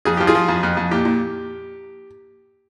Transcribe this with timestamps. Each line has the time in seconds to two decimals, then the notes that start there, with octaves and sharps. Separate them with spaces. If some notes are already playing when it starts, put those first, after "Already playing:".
0.05 F2 G#4
0.17 F3 G4
0.27 F4 G#4
0.35 F3
0.48 F2
0.63 F2
0.77 F2
0.91 A#2 G4
1.05 A#2